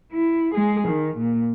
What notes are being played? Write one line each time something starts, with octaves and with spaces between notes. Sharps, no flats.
E4
G#3 G#4
D#3
A#2